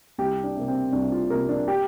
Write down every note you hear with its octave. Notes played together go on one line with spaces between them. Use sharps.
C2 G4
D4
C3 A#3
C4
C2 D4
F4
C3 A#3 A#4
D4
G4